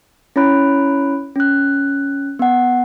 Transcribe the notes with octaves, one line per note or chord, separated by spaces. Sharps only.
C#4 E4 C#5 B5 F#6 D7
C#4 F#6
B3 F#5